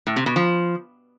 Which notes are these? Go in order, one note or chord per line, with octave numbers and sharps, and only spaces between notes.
A2
C3
B2
F3